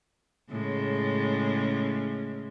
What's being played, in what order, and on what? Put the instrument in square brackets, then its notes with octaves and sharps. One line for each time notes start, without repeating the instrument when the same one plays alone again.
[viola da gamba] A2 C#3 G#3